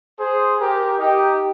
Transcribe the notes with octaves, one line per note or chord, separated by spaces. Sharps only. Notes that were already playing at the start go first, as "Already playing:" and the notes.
G#4 C5
G4 A#4
D#4 G4